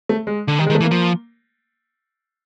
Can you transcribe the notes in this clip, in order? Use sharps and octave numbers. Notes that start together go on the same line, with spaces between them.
A3
G#3
D3
D#3 G3
G#3
D#3
A3
E3
A#3
F3